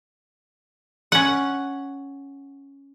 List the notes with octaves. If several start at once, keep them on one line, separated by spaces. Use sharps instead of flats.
C#4 F#5